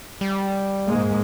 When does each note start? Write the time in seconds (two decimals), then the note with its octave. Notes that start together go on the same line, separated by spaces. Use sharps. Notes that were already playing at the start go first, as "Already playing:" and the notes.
0.21 G3
0.87 G#2 G#3 A#3